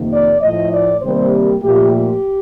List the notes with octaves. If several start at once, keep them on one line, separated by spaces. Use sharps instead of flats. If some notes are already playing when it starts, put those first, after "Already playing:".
Already playing: F2 C3 D#3 A#3
D5
A2 F3 A3 D#5
D5
C3 D#3 G3 A#3 C5
A#2 F3 A3 G4
G4